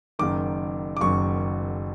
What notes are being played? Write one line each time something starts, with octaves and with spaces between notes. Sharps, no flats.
F#1 F#2 D#3 D6
D6
F#1 F#2 D#3 C#6